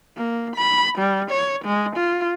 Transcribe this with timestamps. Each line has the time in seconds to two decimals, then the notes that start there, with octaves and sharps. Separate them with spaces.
0.17 A#3
0.56 B5
0.98 G3
1.30 C#5
1.65 G#3
1.96 F4